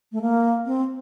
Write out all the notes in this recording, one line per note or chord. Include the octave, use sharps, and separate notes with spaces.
A3
A#3
C4